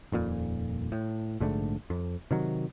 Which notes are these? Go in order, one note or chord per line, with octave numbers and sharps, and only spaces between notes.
D#1 F2 A#2
A2
A#1 G#2 D3 A3
F2
C3 D#3 F#3